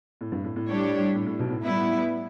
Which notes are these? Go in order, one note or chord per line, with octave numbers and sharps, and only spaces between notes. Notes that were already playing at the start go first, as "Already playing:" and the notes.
A2
G2
A2
A2
G3 D4 G4 C#5
A2
A2
B1 B2
A2
G3 B3 E4